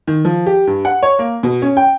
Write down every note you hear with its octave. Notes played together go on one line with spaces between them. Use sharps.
D#3
F3
G4
G2
F#5
C#5
A#3
B2
C#4
G5